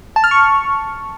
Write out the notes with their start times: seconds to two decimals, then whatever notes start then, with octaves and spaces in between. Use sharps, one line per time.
0.16 A5
0.24 F6
0.31 C#6